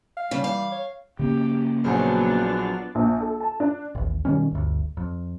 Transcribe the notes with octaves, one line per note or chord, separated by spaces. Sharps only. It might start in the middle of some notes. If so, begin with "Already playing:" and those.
F5
C#3 G3
E3 F5
C#5
C#3 A#3 C#4 G4
A#1 F3 F#3 B3 D4 G#4 F6
A#1
A4
A5
D4
A1 D#2
B2 D#3 G3 C#4
G1 D2
F2